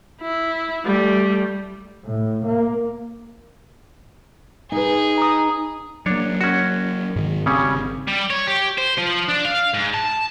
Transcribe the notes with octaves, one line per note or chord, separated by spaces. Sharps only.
E4
G3 A3
A2
A#3
D#4 G#4 B4
A#5 D#6
F#3 A#3 D4 C#5
C#4 F#4
G#2 D#3
G#1 C#3 G3 C4 C#4
G3
C#5
G4
C5
F3
D4
F5
G#2
A5